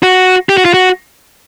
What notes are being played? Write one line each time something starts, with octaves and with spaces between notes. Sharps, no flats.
F#4
G4
F#4
F4
F#4